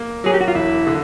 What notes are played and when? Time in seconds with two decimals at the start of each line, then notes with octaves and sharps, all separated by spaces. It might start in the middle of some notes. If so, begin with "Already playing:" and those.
Already playing: A#3
0.24 F#3 G#4
0.34 G4
0.41 F#4
0.48 F4
0.55 E1 E4
0.87 D3